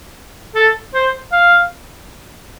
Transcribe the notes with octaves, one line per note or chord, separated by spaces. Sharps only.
A4
C5
F5